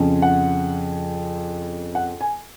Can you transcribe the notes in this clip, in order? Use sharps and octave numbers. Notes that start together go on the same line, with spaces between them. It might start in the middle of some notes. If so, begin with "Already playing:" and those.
Already playing: F2 C#3 F3
F#5
F#5
G#5